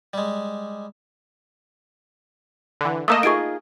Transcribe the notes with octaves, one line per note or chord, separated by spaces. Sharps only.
G3 G#3
D3 E3
A3 A#3 D#5 D#6 E6 E7
D#4 F4 G#4 C#6 D7